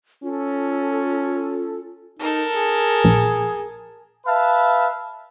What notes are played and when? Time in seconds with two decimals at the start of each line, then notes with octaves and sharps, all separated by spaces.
0.23 C#4 F4 A4
2.19 D#4 A4 A#4
2.53 G#4
3.04 A#1
4.27 B4 E5 F5 A5 B5